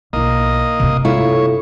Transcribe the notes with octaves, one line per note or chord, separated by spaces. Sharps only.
B1 A#3 E4 D#5
G2 C3
A3 E4 F4 C#5